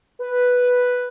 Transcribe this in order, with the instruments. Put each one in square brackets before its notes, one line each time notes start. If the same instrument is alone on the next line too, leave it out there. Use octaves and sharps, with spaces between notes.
[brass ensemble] B4